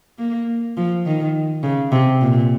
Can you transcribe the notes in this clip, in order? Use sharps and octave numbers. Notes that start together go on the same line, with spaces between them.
A#3
F3
D#3
C#3
C3
A#2